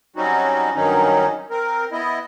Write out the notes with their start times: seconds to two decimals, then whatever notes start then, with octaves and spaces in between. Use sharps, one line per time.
0.16 F#3 G3 C4 C#4 D#4 F#4
0.75 G2 D#3 F#3 C#4 D#4
1.50 C4 A#4
1.92 B3 E4 D#5